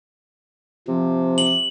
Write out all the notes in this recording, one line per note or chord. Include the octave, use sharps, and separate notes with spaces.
C3 F3
F#7